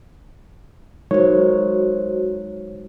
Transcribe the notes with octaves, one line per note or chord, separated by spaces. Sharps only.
F#3 G#3 D#4 F#4 A#4 C5 C#5